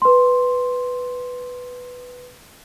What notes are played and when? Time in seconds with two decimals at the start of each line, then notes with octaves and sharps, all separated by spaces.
0.02 B4 C6